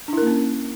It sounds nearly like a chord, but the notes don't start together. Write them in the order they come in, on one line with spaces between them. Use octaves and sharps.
D4 E4 A#4 A#3 C#4